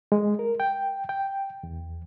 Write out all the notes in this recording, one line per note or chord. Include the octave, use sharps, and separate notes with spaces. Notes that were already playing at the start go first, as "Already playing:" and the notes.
G#3
A#4
G5
G5
E2